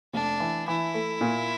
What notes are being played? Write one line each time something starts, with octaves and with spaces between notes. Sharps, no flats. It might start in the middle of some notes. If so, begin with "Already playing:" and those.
F1 D4
E3
E3 E4
A3
A#2